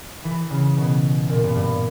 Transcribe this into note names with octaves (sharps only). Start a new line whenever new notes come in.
E3
C#3
B2
A#2
G2
G2